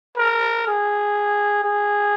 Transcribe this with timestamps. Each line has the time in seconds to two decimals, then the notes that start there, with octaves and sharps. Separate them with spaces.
0.17 A#4
0.67 G#4
1.64 G#4